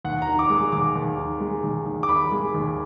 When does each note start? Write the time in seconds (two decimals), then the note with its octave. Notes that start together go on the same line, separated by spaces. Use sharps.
0.05 D#2 F#5
0.22 A#5
0.27 D#3
0.39 D6
0.50 G#3
0.56 D6
0.72 D#2 D6
0.96 D#2
1.18 D#3
1.40 G#3
1.64 D#2
1.86 D#2
2.03 D6
2.09 D#3 B5
2.32 G#3
2.55 D#2